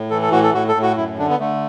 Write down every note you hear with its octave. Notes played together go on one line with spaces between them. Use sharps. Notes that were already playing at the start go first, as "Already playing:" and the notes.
Already playing: A2
E3 A4
A4
A2 F#4
A4
A2 F#4
A4
A2
F#4
F#2 E4
D3 D4
B3
D3 A3